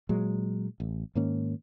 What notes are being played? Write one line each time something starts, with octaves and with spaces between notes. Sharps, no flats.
A#2 F#3 G#3
A1
G#2 D#3 A#3 C#4